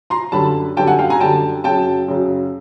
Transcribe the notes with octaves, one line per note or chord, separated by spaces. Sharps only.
A#5 C6
F#2 D3 G3 A5 B5
F#2 D3 G3 G5 A5
F#5 G#5
F5 G5
G#5 A#5
F#2 D3 G3 G5 A5
F#2 C#3 F#3 G5 A5
F#2 C#3 F#3